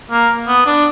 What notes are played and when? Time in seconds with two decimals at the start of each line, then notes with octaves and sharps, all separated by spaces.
0.11 A#3
0.48 B3
0.66 D4